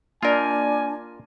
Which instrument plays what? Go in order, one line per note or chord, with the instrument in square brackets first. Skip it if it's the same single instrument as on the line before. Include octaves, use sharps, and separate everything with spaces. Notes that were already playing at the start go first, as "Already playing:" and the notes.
[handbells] A#3 D5 [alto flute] D4 [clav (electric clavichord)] F4 A#4 [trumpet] G#5